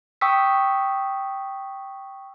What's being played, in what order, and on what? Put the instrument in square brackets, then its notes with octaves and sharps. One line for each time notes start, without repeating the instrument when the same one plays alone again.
[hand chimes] G5 C#6 D#6 E6 B6